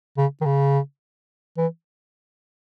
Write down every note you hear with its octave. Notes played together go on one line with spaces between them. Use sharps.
C#3
D#3
C#3
E3